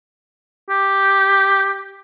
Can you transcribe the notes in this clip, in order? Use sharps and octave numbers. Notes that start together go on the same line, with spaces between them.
G4